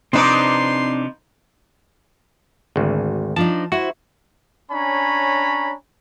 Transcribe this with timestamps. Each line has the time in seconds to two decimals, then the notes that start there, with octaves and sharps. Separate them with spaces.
0.13 C3 F3 C4 D4 D#4 B4 C6 D6
2.76 G#1 D2
3.36 F3 D4 D#4 A5
3.72 E4 F#4 C5
4.71 C#4 D4 C#5 G#5 A#5 B5